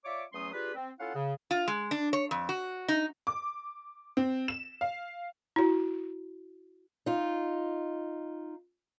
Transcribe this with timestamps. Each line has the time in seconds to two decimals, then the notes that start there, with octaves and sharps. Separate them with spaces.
0.05 F4 C#5 D5 E5 D6
0.33 E2 F#3 A3 C#4 C6 D#6
0.54 D4 F4 G4 G#4 B4
0.75 C4
1.00 C#4 E4 F4 A4 F5 F#5
1.15 C#3
1.51 F4
1.68 G#3
1.91 D4
2.13 C#5
2.31 F2
2.49 F#4
2.88 D#4
3.27 D6
4.17 C4
4.48 E7
4.81 F5
5.56 E4 F#4
7.06 D#4 F4